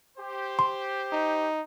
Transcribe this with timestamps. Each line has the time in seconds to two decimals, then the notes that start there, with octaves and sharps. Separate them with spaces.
0.18 G4 C5
0.59 C6
1.13 D#4